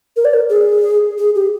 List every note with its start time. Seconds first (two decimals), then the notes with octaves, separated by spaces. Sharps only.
0.16 A#4
0.25 D5
0.34 A#4
0.50 G#4
1.18 G#4
1.35 G4